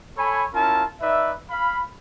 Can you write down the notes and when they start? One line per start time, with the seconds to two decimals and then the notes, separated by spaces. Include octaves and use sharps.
0.18 A4 C#5 G#5 B5
0.54 C#4 E4 F4 A#4 A5
1.01 D#4 B4 D5 E5
1.51 F5 B5